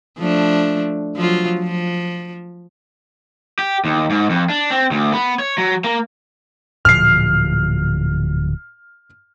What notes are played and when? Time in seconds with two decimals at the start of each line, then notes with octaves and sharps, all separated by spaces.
0.18 F3 A3 D4
1.16 F3 F#3 F4
1.60 F3
3.59 G4
3.85 D#2
4.10 G#2
4.30 F2
4.50 D4
4.71 C4
4.91 D2
5.12 B3
5.39 C#5
5.58 F#3
5.84 A#3
6.85 D1 A#2 F3 F6 C7